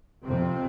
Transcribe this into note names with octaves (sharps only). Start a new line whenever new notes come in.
F2 C3 C4